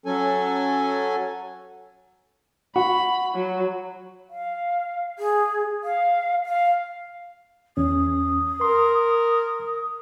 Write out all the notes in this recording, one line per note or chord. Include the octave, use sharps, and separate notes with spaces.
F#3 C#4 A4 G#5
F#4 B5
F#3
F5
G#4
F5
F5
E2 C#4 D#6
A#4 C6